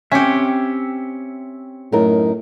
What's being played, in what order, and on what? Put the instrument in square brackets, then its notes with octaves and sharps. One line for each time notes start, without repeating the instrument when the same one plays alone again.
[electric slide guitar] C4 C#5 E5 [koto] C#4 G4
[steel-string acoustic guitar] F#2 D#4 A#4 [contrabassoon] A2